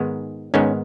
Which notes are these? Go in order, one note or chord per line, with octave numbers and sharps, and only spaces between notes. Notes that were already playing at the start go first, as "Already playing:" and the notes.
Already playing: G#2 D#3 G#3 B3
G#2 D#3 G#3 B3 C#4